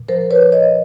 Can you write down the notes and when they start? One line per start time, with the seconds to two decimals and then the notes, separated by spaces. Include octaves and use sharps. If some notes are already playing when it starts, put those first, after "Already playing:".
Already playing: A#2
0.08 F3 A#4 C5
0.31 B4 C#5
0.42 A#2
0.52 C#5 D#5